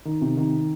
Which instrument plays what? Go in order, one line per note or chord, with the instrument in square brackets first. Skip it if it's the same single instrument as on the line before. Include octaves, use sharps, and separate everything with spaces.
[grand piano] D#3
C3
D#3